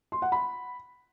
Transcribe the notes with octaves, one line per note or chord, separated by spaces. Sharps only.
C6
F#5
B5